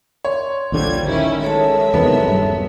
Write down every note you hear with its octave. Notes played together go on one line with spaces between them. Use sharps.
C#5 C6
A#1 D#2 D3 F3 G3 G#6
D#3 C#4 E4
F#3 G#3 A4 C#5 E5 A5
E2 C3 D#3 B3
D#1 G2